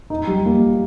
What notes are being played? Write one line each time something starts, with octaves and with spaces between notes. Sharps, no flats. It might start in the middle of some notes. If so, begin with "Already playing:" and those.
D#4
G3
A#3